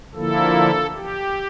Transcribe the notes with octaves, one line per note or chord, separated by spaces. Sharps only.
D3 F3 A#3 E4 A4
G4